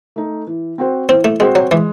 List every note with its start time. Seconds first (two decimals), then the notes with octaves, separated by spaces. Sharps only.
0.16 A3 D#4
0.47 E3
0.78 C4 F#4 C5
1.09 E3 C4
1.24 A3
1.40 G#3 C4 F#4 C5
1.55 F#3
1.71 E3 G#3